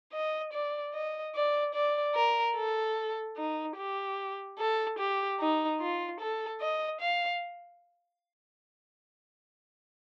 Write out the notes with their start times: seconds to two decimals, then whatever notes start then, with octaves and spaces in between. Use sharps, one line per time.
0.13 D#5
0.53 D5
0.94 D#5
1.35 D5
1.74 D5
2.15 A#4
2.56 A4
3.37 D#4
3.77 G4
4.59 A4
4.98 G4
5.40 D#4
5.80 F4
6.20 A4
6.61 D#5
7.01 F5